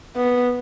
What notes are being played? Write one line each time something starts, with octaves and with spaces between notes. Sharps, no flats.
B3